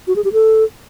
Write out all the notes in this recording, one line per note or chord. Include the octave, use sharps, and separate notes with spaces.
F#4
G#4
G4
A4